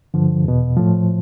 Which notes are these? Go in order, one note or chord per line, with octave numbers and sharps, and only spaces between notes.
G2 D3 F3
E2 B2
A2 F3